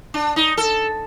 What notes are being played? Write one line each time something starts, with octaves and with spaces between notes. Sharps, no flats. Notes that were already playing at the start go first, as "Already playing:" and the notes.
D4
D#4
A4